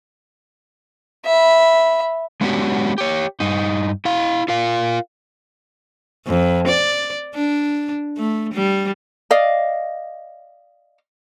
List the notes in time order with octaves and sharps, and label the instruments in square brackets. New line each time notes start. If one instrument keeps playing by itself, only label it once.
[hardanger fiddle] E5 B5
[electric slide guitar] G#3 B3 C#4 D4 F#4 G4
G4 C#5
G2 D#4
E4 F5
F4 A#4 F5
[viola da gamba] F2
D5
D4
A3
G3
[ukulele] D5 D#5 F5